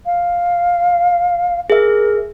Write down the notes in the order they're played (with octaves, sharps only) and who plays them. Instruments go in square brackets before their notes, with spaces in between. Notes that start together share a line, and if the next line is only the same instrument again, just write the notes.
[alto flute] F5
[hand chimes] G#4 E5 [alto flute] A#4